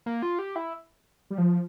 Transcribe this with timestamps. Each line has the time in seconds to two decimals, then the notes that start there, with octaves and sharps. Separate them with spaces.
0.06 A#3
0.23 F4
0.39 G4
0.56 E4
1.30 G3
1.38 F3